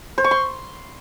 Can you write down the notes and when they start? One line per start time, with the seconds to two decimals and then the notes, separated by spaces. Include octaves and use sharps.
0.18 C5
0.24 C#6
0.31 C6